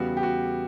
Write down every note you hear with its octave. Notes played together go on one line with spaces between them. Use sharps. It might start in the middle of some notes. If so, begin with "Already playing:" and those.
Already playing: E2 C#3 G3 B3 F#4
G4
F#4